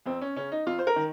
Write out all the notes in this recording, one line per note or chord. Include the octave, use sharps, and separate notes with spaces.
F2 C4
C#4
C#3 C#4
D#4
F2 F4
C5
A#4
D#3